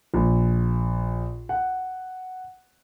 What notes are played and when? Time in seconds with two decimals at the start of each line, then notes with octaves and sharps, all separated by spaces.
0.14 A#1
1.49 F#5